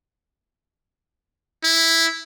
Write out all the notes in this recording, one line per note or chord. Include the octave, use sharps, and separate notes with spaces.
E4